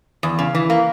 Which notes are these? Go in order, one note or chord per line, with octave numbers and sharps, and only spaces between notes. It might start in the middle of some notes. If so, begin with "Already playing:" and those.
E2
C#3
E3
A#3